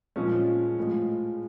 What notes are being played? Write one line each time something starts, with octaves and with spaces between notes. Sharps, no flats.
A#2 F3 G#3 C#4
A2 F3 G#3